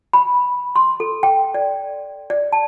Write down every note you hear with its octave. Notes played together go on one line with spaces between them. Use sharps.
B5
C6
A4
G5
D5
D5
A5